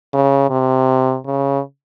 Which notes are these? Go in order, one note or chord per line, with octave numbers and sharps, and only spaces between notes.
C#3
C3
C#3